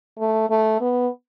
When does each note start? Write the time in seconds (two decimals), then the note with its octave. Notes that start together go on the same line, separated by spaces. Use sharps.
0.19 A3
0.49 A3
0.80 B3